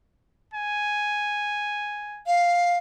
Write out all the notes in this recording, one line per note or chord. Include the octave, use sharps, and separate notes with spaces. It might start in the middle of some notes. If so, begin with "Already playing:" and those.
G#5
F5